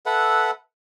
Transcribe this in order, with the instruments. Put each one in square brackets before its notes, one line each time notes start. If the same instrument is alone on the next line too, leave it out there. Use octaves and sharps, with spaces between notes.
[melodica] A4 B4 E5 F#5